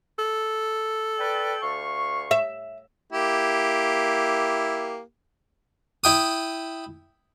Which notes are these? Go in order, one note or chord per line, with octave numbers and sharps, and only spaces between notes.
A4
B4 D5 G5
D2 F5 C#6
E5
A#3 E4 G4
E4 G5 D#6